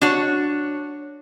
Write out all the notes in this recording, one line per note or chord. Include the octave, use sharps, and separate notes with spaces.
D4 F#4 C#5